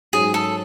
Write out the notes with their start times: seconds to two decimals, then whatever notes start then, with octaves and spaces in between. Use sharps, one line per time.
0.13 G#2 F#3 C#4 G#4
0.34 A4